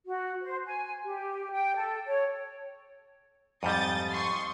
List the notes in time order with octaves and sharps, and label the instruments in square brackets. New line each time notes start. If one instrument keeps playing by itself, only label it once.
[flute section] F#4
C5
G#5
G4
G5
A4
C#5
[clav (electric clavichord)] F2 G#2 G3 [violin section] D#6 G6 A6
[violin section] C6 C#6 D#6